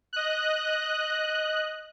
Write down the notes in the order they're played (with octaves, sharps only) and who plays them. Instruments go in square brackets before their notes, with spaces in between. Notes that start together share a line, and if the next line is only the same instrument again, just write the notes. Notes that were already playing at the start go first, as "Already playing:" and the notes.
[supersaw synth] D#5 F#6